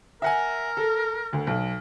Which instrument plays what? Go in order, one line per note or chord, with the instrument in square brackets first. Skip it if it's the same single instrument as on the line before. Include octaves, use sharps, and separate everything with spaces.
[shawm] A#4 [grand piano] E5 F#5 G#5
[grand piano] A4
D2
B1